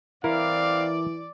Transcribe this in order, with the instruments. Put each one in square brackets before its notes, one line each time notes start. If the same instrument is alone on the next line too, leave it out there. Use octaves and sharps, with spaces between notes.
[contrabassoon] E3 [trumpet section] C4 F5 [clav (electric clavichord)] E4 A#4 [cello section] D5